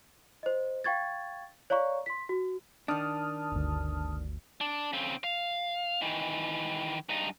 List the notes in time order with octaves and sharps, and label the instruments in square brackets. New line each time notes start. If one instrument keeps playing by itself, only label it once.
[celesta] C5 D#5
F5 G5 C#6 G#6 A6
C#5 D5 F5 A#5 C#6
C6 B6
F#4
[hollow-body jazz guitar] D#3 D4 [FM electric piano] A5 D#6 F6
[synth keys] G1 D2
[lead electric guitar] D4
C#3 C4
F5
D#3 E3
G2 D#4